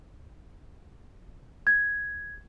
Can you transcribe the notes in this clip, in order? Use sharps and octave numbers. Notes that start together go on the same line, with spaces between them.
G#6